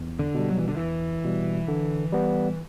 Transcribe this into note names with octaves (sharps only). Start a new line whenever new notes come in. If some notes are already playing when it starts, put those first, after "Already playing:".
Already playing: E2
D3
B2 G3
F#3
E3
D3
E2 E3
B2 G3
D3
G3 B3